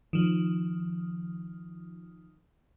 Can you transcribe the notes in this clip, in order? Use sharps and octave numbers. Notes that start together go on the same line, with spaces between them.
D#3 F3